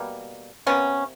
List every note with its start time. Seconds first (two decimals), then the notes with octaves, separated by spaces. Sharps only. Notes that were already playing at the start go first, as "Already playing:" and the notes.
Already playing: B2 G3 A#3
0.66 C3 F3 A#3 B3 C#4